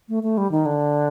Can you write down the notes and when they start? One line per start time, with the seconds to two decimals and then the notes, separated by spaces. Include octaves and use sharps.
0.09 A3
0.23 A3
0.38 G3
0.52 D#3
0.66 D3